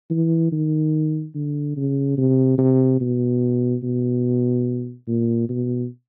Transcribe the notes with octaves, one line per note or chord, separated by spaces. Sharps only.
E3
D#3
D3
C#3
C3
C3
B2
B2
A#2
B2